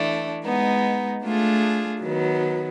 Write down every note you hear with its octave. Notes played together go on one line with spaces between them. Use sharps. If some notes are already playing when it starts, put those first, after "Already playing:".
Already playing: E3 A3 D4
G#3 B3 D#4
A3 D4 F4 G#4
D#3 F#3 B3